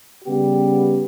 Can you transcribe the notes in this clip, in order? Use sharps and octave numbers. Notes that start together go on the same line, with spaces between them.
C#3 G3 B3 G4